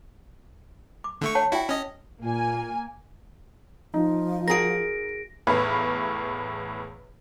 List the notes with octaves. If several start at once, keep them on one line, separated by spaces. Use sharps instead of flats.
D6
D3 A3 C#6
C#5 F#5 A5
E4 F#4 D5 G5
C#4 D#5
A#2 A#3 G#5
F3 D#4
F#4 G#4 A#4 A#6 D7
E2 A2 E3 B4 C#5 F5